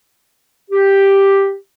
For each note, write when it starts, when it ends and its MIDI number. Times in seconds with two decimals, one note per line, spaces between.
0.71 1.53 67